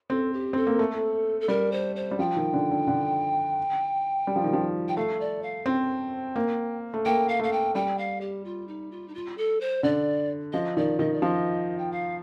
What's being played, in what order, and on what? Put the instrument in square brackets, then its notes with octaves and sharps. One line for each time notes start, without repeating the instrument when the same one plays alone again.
[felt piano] C4 [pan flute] A4
[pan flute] G4
[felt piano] C4 [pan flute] A4
[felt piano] A#3
A3
[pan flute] A4
[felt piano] G3 [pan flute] A#4
[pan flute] C5
C5
[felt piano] G3
[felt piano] F3 [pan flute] G5
[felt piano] D#3
D3
D3
D3
G3
F3
D#3
F3
[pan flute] G5
[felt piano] A3 [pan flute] F5
[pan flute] D5
F5
[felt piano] C4 [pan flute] G5
[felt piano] A#3
A3
[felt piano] A#3 [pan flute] G5
[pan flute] F5
[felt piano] A3 [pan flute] F5
[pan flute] G5
[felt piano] G3 [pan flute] G5
[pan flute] F5
G4
F4
D#4
F4
D#4
F4
A4
C5
[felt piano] D3 [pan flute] D5
[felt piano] F3 [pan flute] D#5
[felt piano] D#3 [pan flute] D5
[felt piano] D#3 [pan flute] D#5
[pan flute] D5
[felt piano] F3 [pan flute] D#5
[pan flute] G5
F5